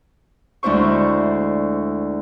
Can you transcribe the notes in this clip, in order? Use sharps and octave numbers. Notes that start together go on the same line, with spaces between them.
D2 G#3 D4 E4 C5 C#6